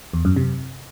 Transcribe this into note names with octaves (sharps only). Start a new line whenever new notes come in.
E2
F#2
C3